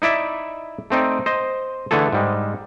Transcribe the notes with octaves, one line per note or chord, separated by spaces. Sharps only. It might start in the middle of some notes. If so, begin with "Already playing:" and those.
D#4 E4 D5 E5
A3 C4 D#4 D5
C5 D#5
D3 E3 A3 G#4 A4
G#2 G3 G#3